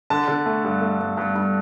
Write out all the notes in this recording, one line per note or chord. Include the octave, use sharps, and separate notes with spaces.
D3 A5
D3
A3
G2
A3
G2
G2
G2